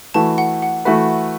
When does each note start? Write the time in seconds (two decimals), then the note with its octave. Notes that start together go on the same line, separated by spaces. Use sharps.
0.14 E3 A3 F#4 B4 A5
0.38 F#5
0.62 F#5
0.85 E3 A3 F#4 B4 E5